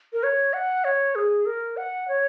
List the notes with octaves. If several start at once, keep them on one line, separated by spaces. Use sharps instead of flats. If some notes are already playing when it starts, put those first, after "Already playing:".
A#4
C#5
F#5
C#5
G#4
A#4
F#5
C#5